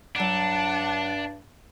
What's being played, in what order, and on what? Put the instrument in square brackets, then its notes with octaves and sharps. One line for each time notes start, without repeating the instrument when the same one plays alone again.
[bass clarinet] G2 [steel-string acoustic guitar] F#3 A#5 [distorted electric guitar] D4 [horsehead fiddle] F#5 A5